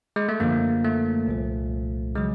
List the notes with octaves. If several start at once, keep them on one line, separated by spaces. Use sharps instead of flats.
G#3
A3
F#2 D3 F3 A#3
A3
C2 A#2 F3
C#3 F#3 G#3